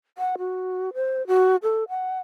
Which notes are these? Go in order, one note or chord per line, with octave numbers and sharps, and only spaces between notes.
F#5
F#4
C5
F#4
A4
F#5